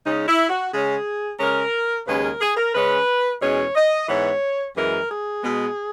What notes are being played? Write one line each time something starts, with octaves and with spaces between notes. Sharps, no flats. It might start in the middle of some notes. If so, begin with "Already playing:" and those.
C#3 G#3 C#4 D#4
E4
F#4
C#3 G#3 C#4 G#4
C#3 G#3 C#4 A#4
D#2 C#3 G#3 C#4 B4
A#4
G#4
A#4
C#3 G#3 C#4 B4
E2 B2 G#3 C#4 C#5
D#5
G#2 E3 B3 C#5
F#2 E3 G#3 A#4
G#4
B2 G#3 B3